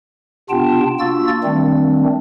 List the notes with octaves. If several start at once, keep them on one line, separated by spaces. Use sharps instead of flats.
C3 B3 D4 F4 G5 A5
A#3 D4 F4 F#4 E6 A6
D#3 G3 A3 C4 D4